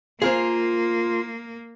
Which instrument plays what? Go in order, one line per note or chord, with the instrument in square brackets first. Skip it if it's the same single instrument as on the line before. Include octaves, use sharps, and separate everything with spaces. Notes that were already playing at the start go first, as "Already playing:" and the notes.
[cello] A#3 [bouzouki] F4 [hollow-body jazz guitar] G#4 A#4 C5